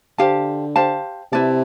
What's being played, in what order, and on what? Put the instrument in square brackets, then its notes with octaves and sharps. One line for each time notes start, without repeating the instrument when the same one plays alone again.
[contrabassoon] D3 [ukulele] G4 C5 F5 A5
[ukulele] G4 C5 F5 A5
[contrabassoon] C3 [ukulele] E4 B4 D5 A5